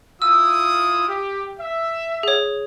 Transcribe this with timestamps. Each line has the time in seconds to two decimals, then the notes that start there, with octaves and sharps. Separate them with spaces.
0.22 E4 F4 D#6 E6
1.07 G4
1.59 E5
2.23 G#4 C#5